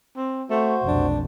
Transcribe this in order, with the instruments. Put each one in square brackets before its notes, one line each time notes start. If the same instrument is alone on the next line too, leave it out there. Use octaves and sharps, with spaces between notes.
[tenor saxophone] C4
[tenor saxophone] A3 [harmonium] F#4 C5
[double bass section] F1 B1 [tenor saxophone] D4